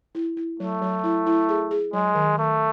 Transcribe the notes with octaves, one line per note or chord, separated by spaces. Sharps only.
E4
E4
F#3 A3
F#3
E4
E4
G#4
G#4
F#3 G#3
D#3
D#3 A3